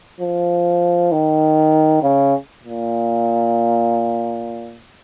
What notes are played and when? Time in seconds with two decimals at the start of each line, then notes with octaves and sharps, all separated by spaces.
0.20 F3
1.12 D#3
2.03 C#3
2.63 A#2